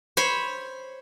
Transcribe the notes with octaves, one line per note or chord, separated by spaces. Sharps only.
C5 C#5 B5